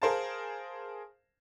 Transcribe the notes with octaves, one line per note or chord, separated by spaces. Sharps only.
G#4 A#4 C5 F5 A5